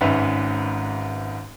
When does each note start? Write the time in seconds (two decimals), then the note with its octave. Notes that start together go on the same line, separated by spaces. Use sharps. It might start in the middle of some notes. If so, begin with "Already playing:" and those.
0.01 G#1 G#2 C#4 B4 E5